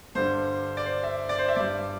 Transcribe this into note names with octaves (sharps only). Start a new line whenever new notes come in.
G2 D3 G3 C5
D5
C5
E5
D5
C5
E5
G2 G3 D5